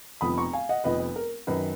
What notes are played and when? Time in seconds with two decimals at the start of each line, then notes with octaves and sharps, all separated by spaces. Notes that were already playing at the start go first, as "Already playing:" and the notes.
0.21 F1 F2 F3 B3 B5 D#6
0.37 A#5 C#6
0.53 F5 G#5
0.69 D#5 F#5
0.84 F1 F2 F3 B3 B4 D#5
1.00 B4
1.16 A#4
1.47 F#2 D#3 F#3 B4